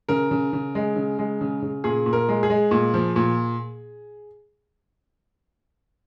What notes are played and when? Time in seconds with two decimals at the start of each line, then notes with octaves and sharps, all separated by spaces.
0.09 C#3 A#4
0.31 C#3
0.53 C#3
0.75 G#3
0.96 C#3
1.19 G#3
1.41 C#3
1.62 C#3
1.84 A#2 G#4
2.06 A#2
2.13 A#4
2.29 G#3
2.43 G#4
2.50 G#3
2.71 A#2
2.94 F3
3.16 A#2